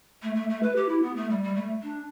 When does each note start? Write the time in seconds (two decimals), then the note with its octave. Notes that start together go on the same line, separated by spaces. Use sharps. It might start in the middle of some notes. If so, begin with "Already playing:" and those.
0.22 A3
0.35 A3
0.49 A3
0.62 B4
0.76 G4
0.88 E4
1.02 B3
1.16 A3
1.30 G3
1.42 G3
1.55 A3
1.82 D4